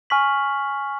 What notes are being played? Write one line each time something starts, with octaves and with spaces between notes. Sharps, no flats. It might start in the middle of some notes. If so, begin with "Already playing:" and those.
G#5 C#6 F6 B6 F#7